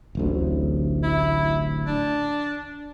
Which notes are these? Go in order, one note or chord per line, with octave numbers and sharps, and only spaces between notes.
D1 A1 D2
E4
D4